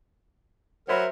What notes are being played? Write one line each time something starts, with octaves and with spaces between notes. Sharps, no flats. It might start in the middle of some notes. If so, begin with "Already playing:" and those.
F#3 A#4 C5 E5 B5